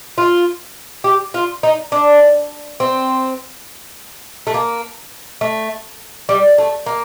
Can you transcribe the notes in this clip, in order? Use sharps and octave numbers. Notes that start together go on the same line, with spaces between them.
F4
G4
F4
D#4
D4
C4
A3
A#3
A3
G3
A3
A#3